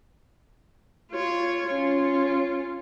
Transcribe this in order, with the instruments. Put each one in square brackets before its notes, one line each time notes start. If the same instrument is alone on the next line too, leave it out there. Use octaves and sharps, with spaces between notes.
[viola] F4 C#5
[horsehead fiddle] C#4 C#5 [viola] F4